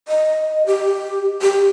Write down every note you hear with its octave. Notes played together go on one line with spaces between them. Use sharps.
D#5
G4
G4